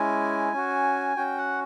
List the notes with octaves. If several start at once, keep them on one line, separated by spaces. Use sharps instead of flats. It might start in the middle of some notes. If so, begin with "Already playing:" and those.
Already playing: G#3 C#4 E4 G#5
C#4 F#4
C#4 F#4 G5
F#5